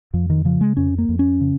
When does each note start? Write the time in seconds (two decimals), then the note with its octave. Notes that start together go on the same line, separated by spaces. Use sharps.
0.14 F2 F3
0.30 D#3
0.45 C#3 F3
0.61 G#3
0.77 F2 C#4
0.98 A#3
1.09 F2
1.19 C#4
1.41 C#3